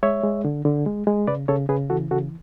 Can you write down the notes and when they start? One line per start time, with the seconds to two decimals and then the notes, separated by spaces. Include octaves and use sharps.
0.03 G#3 C#5 E5
0.24 G#3
0.45 D3
0.65 D3
0.86 G#3
1.07 G#3
1.27 C#3 B4 D5
1.48 C#3 A4 C#5
1.69 C#3 G#4 B4
1.90 E3 F#4 A4
2.11 C#3 F#4 A4